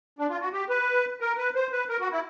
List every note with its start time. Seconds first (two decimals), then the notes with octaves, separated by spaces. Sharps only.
0.19 D4
0.30 F4
0.41 F#4
0.52 G4
0.69 B4
1.21 A#4
1.37 B4
1.55 C5
1.72 B4
1.89 A#4
2.00 F#4
2.12 E4